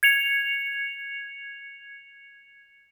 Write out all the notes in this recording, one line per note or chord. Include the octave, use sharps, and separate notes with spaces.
G#6 C#7 F7